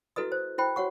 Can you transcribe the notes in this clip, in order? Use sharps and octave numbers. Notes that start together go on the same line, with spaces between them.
E4 F#4 A4 B4 D#5 D#6
C5
E4 C5 G5 B5
F#4 C#5 F#5 C#6